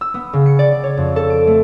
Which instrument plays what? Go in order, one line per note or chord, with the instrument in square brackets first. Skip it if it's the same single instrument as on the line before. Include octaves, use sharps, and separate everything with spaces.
[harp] E6
B3
C#3
C#7
D5
C#5
F2
A4
D7
A3